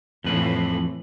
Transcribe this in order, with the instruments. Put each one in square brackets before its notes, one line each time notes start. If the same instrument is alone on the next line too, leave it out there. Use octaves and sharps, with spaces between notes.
[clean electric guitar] F2 B4 [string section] A2 E3 F3